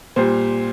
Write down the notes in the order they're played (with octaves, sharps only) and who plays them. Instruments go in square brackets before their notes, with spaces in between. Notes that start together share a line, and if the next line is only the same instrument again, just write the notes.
[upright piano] A#2 G3 C5